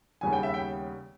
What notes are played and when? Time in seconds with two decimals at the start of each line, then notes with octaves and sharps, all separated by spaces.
0.21 D#2 C#3 G3 B3 G#5
0.33 G5
0.43 E5
0.54 G5